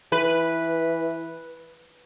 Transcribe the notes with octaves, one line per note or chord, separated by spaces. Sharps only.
E3 B4